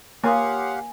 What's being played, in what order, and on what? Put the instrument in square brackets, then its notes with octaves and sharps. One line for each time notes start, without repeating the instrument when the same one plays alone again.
[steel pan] A#3 [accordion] G4 F5 F#5 [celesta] C#5 C6 D#6 [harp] G#5